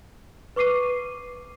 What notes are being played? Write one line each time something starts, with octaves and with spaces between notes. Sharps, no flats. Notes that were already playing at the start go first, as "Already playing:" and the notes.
B4 C#6 D6 C7 D#7